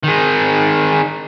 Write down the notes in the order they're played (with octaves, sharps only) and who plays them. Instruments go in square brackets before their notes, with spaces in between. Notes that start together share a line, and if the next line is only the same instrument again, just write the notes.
[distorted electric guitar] D#3 G#3